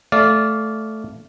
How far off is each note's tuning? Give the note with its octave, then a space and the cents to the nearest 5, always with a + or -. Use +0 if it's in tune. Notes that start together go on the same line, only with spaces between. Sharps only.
A3 -5 D5 -20 F5 +0